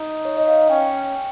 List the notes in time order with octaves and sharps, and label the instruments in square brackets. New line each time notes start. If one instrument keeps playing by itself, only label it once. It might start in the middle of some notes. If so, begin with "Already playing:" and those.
Already playing: [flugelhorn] D#4
[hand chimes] C#5
D#5
F5
[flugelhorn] C#4 [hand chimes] G5